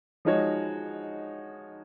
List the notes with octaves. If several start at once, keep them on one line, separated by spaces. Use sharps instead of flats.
F3 G#3 D#4 F#4 C#5